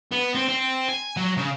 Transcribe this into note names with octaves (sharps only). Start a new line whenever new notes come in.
B3
C4
C4
G#5
F#3
C#3